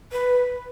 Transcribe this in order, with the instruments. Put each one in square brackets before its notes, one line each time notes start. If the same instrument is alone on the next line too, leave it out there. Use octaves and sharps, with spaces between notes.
[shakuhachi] B4